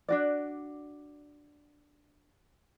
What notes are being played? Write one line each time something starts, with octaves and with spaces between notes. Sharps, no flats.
D4 F#4 D5